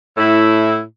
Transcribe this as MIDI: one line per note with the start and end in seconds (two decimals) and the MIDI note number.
0.18 0.81 45
0.18 0.81 64